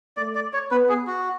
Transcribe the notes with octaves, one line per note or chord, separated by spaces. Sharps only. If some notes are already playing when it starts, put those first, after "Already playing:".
A3 D5
D5
C#5
B3 B4
G#4
F#4